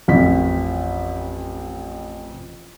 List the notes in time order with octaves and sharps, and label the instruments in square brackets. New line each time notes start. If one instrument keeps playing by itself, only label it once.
[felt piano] A1 F2 B6